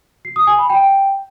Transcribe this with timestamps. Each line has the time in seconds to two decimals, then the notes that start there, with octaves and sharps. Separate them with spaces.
0.25 C7
0.36 D#6
0.47 G#5
0.58 B5
0.70 G5